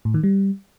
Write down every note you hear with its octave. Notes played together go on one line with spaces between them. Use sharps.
A2
D#3
G3